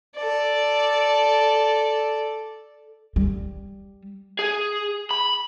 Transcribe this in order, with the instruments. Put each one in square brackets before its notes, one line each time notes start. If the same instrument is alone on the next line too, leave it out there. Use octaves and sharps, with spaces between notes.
[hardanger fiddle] A4 D5
[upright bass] G3
[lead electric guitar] G#4
B5